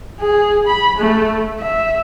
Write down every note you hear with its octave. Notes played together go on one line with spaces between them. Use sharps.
G#4
B5
A3
E5